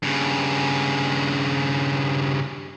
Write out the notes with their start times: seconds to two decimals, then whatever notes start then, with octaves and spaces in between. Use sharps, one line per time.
0.03 G2 C#3